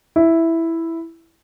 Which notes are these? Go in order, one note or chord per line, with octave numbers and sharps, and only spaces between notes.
E4